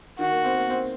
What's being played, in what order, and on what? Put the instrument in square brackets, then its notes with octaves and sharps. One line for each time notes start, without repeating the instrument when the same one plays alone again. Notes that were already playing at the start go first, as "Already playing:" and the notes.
[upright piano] D#3 [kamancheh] F#4
[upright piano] A#3
C4
A#3
C4